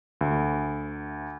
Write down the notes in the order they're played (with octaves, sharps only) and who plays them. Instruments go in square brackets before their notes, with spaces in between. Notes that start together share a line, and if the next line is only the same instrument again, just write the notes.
[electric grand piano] D2